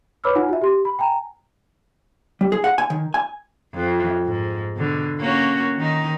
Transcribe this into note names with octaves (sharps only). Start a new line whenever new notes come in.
B4 C#5 B5 D6 E6 F6
D#4 F4 F#5 G#5
F#4 E5
G4 C6
B5
G5 G#5 A#5
G3
G#4
F#5
G#5
D#3
G#5
F2
G#2
B2 D3
A#3 C#4 F#4
D#3 D#4